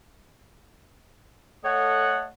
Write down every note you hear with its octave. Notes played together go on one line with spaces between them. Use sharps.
A3 A4 C#5 D#5 F#5